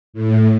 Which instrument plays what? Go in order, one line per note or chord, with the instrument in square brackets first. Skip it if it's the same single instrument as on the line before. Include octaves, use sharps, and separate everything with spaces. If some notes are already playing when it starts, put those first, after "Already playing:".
[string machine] A2